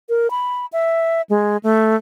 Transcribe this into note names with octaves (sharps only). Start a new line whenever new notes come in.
A#4
B5
E5
G#3
A3